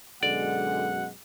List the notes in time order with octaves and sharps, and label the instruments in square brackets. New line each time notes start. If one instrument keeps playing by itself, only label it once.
[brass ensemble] F#2 B2 G#3 [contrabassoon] D3 [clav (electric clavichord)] D5 [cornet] F#5